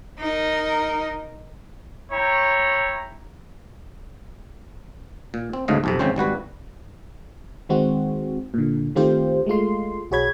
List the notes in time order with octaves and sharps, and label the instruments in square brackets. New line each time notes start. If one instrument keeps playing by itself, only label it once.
[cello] D#4 A#4
[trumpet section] E4 C#5 G5 A#5
[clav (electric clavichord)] A#2
C4
D2 G#2 C#3 A3 D#5 F5
B1 F2 C3
G#1 C#3 C4 C#4 C5
G#1 G3 F#4 B4
[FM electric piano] D#3 G#3 C4 F#4
A#2 D3
D#3 A3 C4 F4 G4 C5
G#3 A3 F4 C6
B1 F#4 G#4 C#5 B5 G#6